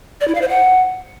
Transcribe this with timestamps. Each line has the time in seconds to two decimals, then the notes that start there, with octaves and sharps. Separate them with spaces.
0.21 D5
0.28 E4
0.35 F5
0.42 C5
0.49 F#5